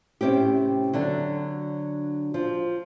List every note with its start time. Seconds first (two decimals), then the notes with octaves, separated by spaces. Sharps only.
0.21 A2 C3 C4 C#4 G4
0.93 D3 F#3 D4
2.34 F3